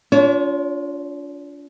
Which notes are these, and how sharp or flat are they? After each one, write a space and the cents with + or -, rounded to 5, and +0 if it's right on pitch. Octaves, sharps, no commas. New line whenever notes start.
D4 -40 F4 +0 C#5 +10